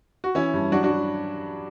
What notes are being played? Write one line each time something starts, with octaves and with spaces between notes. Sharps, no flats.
F#4
E3 C#4 E4
G2
F#3 D4 F#4
D4 F#4
F#3